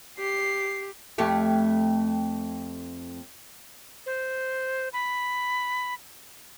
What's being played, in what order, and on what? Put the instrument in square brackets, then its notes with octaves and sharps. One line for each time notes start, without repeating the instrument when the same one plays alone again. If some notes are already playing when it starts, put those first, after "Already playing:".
[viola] G4 [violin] C7
[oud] F2 A3 G4
[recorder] C5
B5